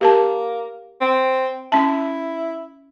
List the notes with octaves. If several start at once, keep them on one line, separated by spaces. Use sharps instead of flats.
A#3 G4 A#4 A5
C4
C#4 E4 A5